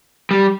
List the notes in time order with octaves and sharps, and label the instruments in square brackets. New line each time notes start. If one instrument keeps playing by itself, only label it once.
[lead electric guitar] G3